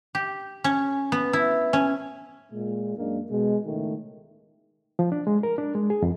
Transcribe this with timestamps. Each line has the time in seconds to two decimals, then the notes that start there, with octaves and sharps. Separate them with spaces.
0.15 G4
0.64 C#4
1.12 B3
1.33 E4
1.73 C#4
2.52 A#2 G#3
2.98 F#2 G#3 A#3 D4
3.31 B2 G#3
3.66 C#2 A2 D#3 A3
4.99 F3
5.12 D4
5.27 G#3
5.43 A#4
5.58 D4
5.75 G#3
5.90 G#4
6.02 F2